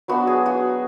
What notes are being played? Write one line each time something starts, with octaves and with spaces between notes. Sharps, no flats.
F#3 B3 D4 F#4
G#4
F#4